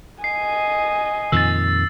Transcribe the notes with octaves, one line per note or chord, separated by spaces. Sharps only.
D#5 G#5 C7
F2 A#2 D#3 E6 A6